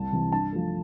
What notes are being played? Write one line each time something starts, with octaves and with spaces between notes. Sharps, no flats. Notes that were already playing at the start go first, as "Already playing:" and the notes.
Already playing: C2 A5
C3 E3
G2 A5
F3 A3